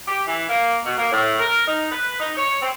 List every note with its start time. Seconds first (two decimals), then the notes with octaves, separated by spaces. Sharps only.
0.08 G4
0.27 E3
0.49 A#3
0.85 B2
0.97 A#3
1.12 A2
1.39 A#4
1.68 D#4
1.92 B4
2.20 D#4
2.37 C#5
2.62 C4